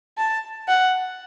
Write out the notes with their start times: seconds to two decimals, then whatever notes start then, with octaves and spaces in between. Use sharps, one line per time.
0.18 A5
0.68 F#5